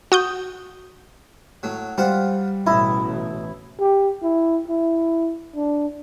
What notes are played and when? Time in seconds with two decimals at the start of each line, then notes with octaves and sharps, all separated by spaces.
0.12 F#4 D#6 G6
1.63 A2 F#3
1.98 G3 F4 C5 F#5
2.66 A1 B2 E4 D#5
3.80 G4
4.22 E4
4.68 E4
5.55 D4